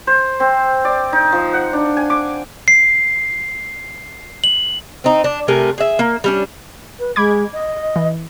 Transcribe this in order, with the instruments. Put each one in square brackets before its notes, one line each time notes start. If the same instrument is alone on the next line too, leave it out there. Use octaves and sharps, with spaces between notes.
[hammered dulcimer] C5
C4
D5
D#4
F3
F#5
D4
G#5
D6
[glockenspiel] C7
F#7
[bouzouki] C4 D#4
D4
C3 A3 A#4 G#5
G#4 E5
A#3
G3 C#4 D4
[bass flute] B4
[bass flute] G#3 [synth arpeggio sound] B5 D6 G#6
[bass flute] D#5
[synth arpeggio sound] E3